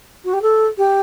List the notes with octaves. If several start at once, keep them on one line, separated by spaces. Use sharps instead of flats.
F#4
G4
A4
G4